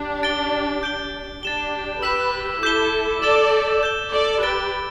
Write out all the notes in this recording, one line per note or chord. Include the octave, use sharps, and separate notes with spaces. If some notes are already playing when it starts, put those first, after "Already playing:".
Already playing: D4 G4
A6 D7 G7
G6 D7 G7
D4 G4 A6 E7 G7
G4 B4 E6 B6 E7
E4 A4 D6 G6 B6 G7
A4 D5 E6 A6 E7 G7
G6 E7 G7
A4 D5
G4 B4 A6 D7 G7